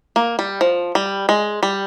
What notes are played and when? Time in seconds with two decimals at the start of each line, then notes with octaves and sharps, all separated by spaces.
0.16 A#3
0.39 G3
0.61 F3
0.95 G3
1.29 G#3
1.63 G3